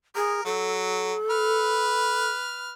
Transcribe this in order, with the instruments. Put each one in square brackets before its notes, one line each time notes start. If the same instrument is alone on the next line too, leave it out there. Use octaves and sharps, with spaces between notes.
[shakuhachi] G#4 [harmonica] A#4
[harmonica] F#3 [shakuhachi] A4
[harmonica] B4 F6